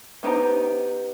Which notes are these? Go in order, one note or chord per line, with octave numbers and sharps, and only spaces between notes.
B3 D#4 G4 C5 A#5